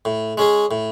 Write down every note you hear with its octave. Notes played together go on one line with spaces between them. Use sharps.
A2
G#3 C#4 G#4
A2